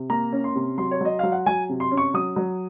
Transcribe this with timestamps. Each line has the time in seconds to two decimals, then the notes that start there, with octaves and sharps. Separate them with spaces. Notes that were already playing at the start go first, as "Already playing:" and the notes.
Already playing: C3
0.10 A#3 A#5
0.33 C#4
0.44 C6
0.55 C3
0.78 F#3 C6
0.91 C#5
1.01 F#3 D#5
1.19 F#3 F5
1.32 F#5
1.46 F#3 G#5
1.69 C3
1.80 C6
1.91 C#4
1.97 C#6
2.14 F#3 D#6
2.36 F#3